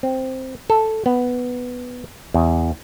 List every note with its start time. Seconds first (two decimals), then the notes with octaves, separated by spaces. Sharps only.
0.03 C4
0.70 A4
1.06 B3
2.34 E2